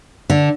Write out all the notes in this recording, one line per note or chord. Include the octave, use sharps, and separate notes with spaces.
D3